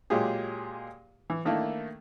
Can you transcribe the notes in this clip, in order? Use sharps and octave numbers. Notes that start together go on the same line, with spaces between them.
A#2 F#3 G#3 F4 G4 G#4
E3
D#3 A3 A#3 D4 E4